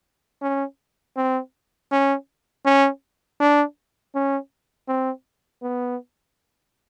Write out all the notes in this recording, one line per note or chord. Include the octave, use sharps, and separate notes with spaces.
C#4
C4
C#4
C#4
D4
C#4
C4
B3